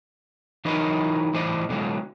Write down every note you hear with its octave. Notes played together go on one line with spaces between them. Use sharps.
E3 F#3 D#4 A#4 B4 D#5
A2 E3 C5 D5 D#5
B2 D3 F#3 G#3